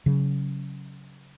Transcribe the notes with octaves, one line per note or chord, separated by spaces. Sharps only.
C#3 F#3